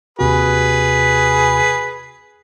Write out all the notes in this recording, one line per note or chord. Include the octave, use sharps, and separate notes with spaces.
D#2 C3 F#4 G#4 B4